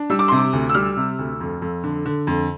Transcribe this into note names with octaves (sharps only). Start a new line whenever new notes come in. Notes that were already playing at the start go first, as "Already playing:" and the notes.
Already playing: D4
G3 E6
D6
C3 C6
D6
D2
E6
G3 F6
C3
D2
F2
F2
D3
D3
F2